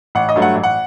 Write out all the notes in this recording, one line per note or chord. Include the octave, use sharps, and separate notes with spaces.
A1 F#5
D#5
G2 F#3 A3
F#5
A1
F#5